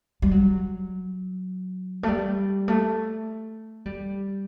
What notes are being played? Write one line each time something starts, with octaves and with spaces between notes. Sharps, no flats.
G3
F#3
A3
G3
A3
G3